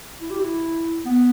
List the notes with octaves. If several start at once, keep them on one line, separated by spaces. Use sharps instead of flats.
E4
G4
E4
B3